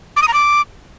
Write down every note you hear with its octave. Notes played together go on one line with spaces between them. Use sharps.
D6
D#6
A#5
D6